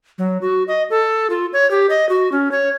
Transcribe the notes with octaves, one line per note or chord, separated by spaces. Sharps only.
F#3
F#4
D#5
A4
F4
C#5
G4
D#5
F#4
C#4
C#5